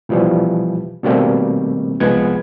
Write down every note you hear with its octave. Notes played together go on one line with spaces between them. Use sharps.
B2 E3 F3 G3
B2 D#3 G3 A3 A#3 C4
C2 F3 G#3 B3 F#5 G#6